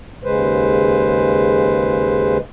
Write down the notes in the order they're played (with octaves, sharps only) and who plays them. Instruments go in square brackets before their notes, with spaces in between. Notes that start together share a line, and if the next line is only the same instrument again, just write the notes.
[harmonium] D#2 C#3 G#3 B4 C5